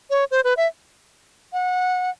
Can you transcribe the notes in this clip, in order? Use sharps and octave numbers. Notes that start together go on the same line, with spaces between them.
C#5
C5
B4
E5
F#5